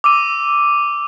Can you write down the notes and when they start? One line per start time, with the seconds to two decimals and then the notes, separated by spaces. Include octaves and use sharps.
0.04 D6 E6 D#7